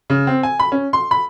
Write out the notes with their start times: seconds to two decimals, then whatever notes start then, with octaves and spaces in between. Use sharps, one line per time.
0.10 C#3
0.27 C4
0.43 G#5
0.60 B5
0.72 C#4
0.93 C6
1.11 B5